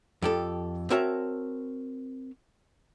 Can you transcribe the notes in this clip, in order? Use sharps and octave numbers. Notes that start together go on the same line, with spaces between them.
F2 G4 A4
C4 F#4 A#4 C#5 E5 A5